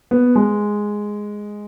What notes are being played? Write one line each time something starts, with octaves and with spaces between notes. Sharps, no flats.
B3
G#3